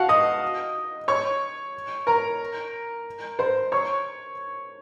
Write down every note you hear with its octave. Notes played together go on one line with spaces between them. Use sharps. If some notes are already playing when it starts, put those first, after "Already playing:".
Already playing: F#4 F5 F#5 A5
D#5 D#6
C#5 C#6
A#4 A#5
C5 C6
C#5 C#6